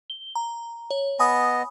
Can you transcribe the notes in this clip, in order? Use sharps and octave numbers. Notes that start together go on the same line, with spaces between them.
G7
A#5
C#5
B3 D#5 G#5 B5 D#6